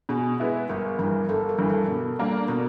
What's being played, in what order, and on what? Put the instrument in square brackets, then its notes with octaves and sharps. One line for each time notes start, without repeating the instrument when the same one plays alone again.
[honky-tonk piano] B2 [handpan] G#4
[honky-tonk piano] G#3 B3 E4
[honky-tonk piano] G1 [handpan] A#4
[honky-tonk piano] G2 E3 [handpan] A#4
[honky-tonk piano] G1 [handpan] A4
[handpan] A#4
[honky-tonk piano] G2 E3
[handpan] A4
[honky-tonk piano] B2
G3 A#3 D4
[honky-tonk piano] B2 [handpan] A#4